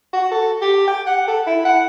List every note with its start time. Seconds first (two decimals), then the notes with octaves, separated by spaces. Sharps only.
0.13 F#4
0.31 A4
0.62 G4
0.88 G5
1.07 F#5
1.28 A4
1.47 E4
1.65 F#5